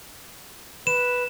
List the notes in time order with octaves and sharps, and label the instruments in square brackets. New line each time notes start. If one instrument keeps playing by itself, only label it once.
[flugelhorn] B4 [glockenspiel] E7